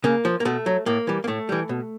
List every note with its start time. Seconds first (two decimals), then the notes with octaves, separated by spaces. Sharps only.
0.04 C#3 A#3
0.25 F3
0.40 A#3
0.45 B2 A3
0.66 F#3
0.86 A2 A#3
1.07 E3 G3
1.24 A#3
1.27 A2 A3
1.49 E3 G3
1.69 B2